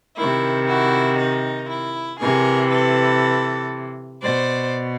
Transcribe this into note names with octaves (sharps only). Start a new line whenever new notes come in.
C3 D#3 E4
E4 F#4
D#4
E4
C3 E3 G#4 A#4
A4 B4
B2 C5 D5